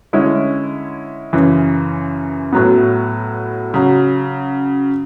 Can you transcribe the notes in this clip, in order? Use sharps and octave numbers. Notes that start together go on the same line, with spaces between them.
D3 G#3 C#4 E4
F#2 C#3 E3
A2 F#3 B3
C#3 F#3